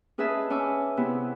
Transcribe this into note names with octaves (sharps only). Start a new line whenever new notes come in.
C#4 G#4 B4 D#5 E5 A5
C#4 G#5 D6 E6
C3 B3 E4